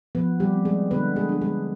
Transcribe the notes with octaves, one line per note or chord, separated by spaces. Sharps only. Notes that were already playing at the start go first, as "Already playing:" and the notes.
F3 B3 B4
G3 G4
C4
G#3 G#4
D3 B3 B4
G#3 G#4
G#3 D4
G#3 G#4